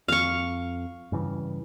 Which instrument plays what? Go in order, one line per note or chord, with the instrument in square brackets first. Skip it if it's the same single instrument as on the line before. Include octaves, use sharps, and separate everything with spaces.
[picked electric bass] F2 [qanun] F5 C#6
[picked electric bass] G2 C#3 E3